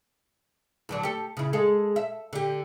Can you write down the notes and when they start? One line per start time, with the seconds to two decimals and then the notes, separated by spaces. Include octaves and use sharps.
0.89 D2 F#3 D4
1.03 G4 A4
1.37 C#3 E4
1.53 G#3 G#4 A4
1.96 E5
2.33 D3 G4